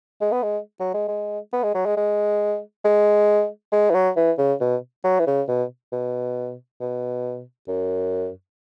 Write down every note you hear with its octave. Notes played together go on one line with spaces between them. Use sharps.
G#3
B3
G#3
F#3
G#3
G#3
B3
G#3
F#3
G#3
G#3
G#3
G#3
E3
F#3
E3
C#3
B2
F#3
E3
C#3
B2
B2
B2
F#2